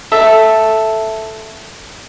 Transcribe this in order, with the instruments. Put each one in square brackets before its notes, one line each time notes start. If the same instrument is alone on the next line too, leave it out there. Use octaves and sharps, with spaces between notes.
[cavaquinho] A4 E5